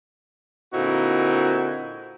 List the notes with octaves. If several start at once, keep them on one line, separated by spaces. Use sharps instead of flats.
A#2 D3 C4 D#4 E4 F#4